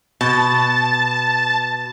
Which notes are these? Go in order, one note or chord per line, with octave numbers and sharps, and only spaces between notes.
B2 A5